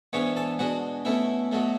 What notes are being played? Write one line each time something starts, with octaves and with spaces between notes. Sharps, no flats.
G#2 E3 B3 D4 C#5 C#6
A4 A5
B2 G#3 D4 F#4 F#5
B2 A3 C#4 E4 E5
B2 F#3 A3